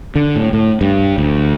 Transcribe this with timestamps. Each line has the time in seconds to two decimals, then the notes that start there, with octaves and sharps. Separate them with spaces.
0.16 D3
0.36 A2
0.53 A2
0.81 G2
1.18 D2